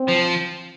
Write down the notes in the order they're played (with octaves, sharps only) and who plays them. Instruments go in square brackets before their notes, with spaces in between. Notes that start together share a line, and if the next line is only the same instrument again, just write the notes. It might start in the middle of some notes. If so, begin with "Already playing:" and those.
Already playing: [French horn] C4
[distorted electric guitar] F3